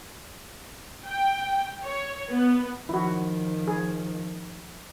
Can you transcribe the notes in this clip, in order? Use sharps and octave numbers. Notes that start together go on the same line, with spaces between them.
G5
C#5
B3
D#3 F3 E4 F#4
G#4